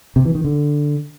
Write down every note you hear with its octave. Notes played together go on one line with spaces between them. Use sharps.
C3
E3
D#3
D3